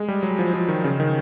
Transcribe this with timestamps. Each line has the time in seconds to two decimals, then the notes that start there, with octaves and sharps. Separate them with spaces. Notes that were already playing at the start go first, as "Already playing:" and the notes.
Already playing: G#3
0.08 G3
0.23 F#3
0.39 F3
0.54 F3
0.68 D#3
0.84 C#3
1.00 D#3